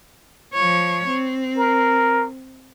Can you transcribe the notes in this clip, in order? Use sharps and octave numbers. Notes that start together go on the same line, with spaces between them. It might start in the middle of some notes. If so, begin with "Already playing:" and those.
F3 C#5
C4
A#4